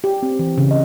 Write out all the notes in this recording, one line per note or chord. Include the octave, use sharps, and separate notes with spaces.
G4
C4
E3
C#3
D#5